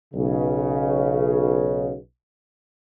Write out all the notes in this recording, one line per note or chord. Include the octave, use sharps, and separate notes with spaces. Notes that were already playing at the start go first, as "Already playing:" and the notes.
B1 C#3